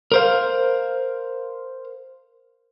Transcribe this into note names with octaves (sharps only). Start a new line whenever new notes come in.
A#4 C5 F5